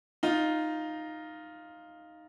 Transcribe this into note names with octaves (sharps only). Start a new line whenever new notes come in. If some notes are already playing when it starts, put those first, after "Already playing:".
D#4 F4